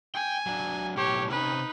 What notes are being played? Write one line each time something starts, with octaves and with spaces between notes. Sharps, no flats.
G5 G#5
F#3 D4
B1 A2 G4 C#5
C3 C#4 D#4 B4